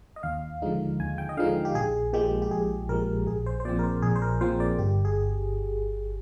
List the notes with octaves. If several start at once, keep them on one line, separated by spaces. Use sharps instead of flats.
D#5
D#2 F5
D3 F3 G#3 D#4
D#2 G#5
G5
D#5
D3 F3 G#3 D#4 F5
G4
A#1 G#4
A#2 F3 G#3 G4
G4
A#1 G#4
A#2 F3 G#3 A#4
A#1 G#4
C5
C5
A#2 F3 C4 D5
A#4
C5
A#1 G#4
C5
A#4
A#2 F3 C4 C5
D5
G1 G4
G#4